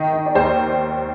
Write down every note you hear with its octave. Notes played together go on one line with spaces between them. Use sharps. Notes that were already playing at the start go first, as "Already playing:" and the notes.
Already playing: D#3 D#5
D#3
D5
D#2 C5